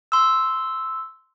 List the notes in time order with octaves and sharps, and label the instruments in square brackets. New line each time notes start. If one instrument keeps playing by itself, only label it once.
[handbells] C6 E6